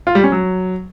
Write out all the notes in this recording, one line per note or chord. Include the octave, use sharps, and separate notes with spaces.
F4
G3
C#4
F#3